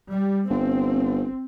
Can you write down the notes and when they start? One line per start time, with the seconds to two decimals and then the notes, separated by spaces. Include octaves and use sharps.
0.10 G3
0.50 G1 C4